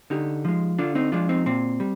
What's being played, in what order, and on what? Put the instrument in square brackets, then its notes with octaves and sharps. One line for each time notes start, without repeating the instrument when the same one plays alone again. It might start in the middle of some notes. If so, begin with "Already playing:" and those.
[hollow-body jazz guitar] D3 D#4 G4
F3 G#3
D3 D4 F4
C4 D#4
F3 G#3 D4 F4
C4 D#4
A#2 C4
G3